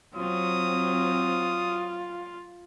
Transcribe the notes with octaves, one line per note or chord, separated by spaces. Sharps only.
F#3 C4 F4 D#6